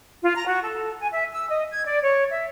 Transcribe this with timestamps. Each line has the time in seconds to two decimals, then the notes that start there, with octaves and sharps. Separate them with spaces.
0.23 F4
0.34 A#5
0.46 F#4
0.62 A4
0.99 G#5
1.12 E5
1.31 E6
1.49 D#5
1.71 G#6
1.86 D5
2.01 C#5
2.30 E5